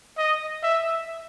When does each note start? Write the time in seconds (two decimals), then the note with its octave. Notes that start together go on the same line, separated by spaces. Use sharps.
0.18 D#5
0.63 E5